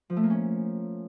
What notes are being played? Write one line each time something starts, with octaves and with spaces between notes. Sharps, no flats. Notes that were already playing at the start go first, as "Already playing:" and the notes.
F3
A3
A#3
C#4